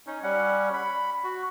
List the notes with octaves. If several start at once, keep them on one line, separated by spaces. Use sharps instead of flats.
C#4 D#4
G3 C#4 F#5
B5
F#4